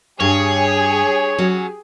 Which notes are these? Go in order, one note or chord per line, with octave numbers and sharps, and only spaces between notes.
G2 G4 G#4 C#5
F#3 C#4